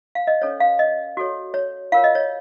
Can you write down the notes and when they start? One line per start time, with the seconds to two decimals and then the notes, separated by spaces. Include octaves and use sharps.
0.15 F5
0.27 D#5
0.42 C#4 A4 C5 C#5
0.61 F5
0.79 D#5
1.17 F#4 A4 C#5
1.54 C#5
1.92 F4 A#4 C#5 F5
2.04 D#5
2.15 C#5